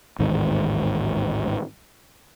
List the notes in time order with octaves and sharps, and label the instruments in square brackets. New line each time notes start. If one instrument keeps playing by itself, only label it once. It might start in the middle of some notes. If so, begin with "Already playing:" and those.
[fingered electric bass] A1 D#2 G#2 D#3